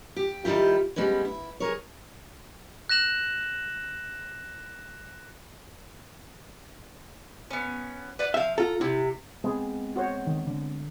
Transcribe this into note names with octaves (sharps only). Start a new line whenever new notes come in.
G4
D#3 G3 E4 F4 G4
G3 G#3 B3 C#4
E4
G#4 A#4 C#5
F#6 A#6 E7 F#7
B3 C#4
B4 D5 F#5
F3 E5 F5
F4 A4 A#5
C3 E4
G#3 B3 C4 G#4
F#4 C5 C#5
D#3
D3